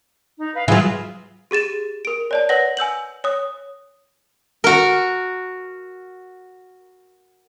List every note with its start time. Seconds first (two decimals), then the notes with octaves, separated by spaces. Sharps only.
0.39 D#4
0.54 B4 F5
0.68 E3 F#3 F4 G#4 B4
1.51 G4 G#4 A6 E7
2.05 A#4 D7
2.31 C#5 D5 A5
2.49 B4 C#5 D5 F#5 A#6
2.77 G#5 E6 G6 F#7
3.24 C#5 D#6
4.64 F#4 A#4